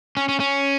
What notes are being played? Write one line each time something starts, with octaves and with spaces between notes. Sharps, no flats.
C#4
C#4
C#4